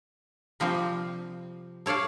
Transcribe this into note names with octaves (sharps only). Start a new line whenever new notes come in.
C3 F3 G3 C4
A4 C#5 D5 F5 A5